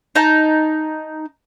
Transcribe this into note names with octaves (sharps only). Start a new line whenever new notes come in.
D#4 A5